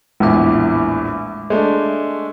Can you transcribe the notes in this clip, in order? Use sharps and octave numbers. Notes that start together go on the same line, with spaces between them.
A#1 E2 A2 G#3 D6
G#3 A3 D4